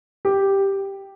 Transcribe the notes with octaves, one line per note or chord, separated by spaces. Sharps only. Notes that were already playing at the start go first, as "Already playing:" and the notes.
G4